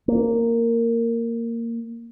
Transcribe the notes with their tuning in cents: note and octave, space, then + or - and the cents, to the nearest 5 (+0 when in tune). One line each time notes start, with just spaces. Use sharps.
A#3 -10